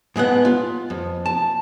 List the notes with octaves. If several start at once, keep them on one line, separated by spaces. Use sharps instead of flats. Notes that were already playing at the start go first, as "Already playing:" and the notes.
A2 G#3 B3 F#5
F4
F2
A5